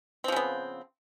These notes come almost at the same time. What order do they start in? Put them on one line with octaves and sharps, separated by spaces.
C4 F3 C#3 B3